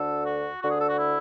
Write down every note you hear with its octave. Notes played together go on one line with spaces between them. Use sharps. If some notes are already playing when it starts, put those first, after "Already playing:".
Already playing: D2 D3 A4
F#4
D2 D3 F#4
G#4
A4
F#4
E4